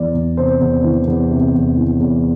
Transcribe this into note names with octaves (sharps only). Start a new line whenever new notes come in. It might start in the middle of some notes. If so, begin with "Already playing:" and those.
Already playing: E2 E3 D5
E2
C3 C5
E2
E3
E2
C3
E2
E3
E2